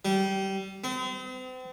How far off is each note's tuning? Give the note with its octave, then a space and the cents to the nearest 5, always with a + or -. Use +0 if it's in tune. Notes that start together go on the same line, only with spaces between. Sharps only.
G3 -20
C4 -40